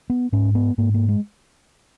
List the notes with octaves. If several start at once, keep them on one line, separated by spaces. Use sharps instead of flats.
B3
G#2 C#4
B3
G#2 A#3
A#3
G#3